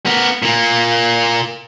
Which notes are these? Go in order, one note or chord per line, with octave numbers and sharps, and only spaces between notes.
B3 A#4
A#2 A#3